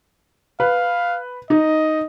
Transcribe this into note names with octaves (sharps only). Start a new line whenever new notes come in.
B4 F5
D#4 D#5